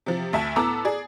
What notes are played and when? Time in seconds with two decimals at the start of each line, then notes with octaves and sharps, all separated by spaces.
0.06 C3 F3
0.33 D2 E5 A5
0.56 A2 B3 A4 A#5 D6 E6
0.85 G#4 D5